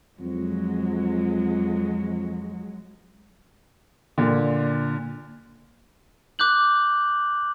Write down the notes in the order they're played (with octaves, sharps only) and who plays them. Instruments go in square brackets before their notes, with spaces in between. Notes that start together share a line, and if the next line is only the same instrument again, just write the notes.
[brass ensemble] F2 [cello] F#3 G#3
[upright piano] A#2 D3
[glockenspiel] D6 F#6 G6 F#7